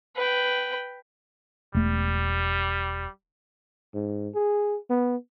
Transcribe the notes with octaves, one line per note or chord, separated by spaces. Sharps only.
B4 G5
E1 G3 A3
G#2
G#4
B3